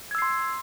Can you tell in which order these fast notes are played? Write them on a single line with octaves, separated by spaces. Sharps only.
G#6 E6 C7 C6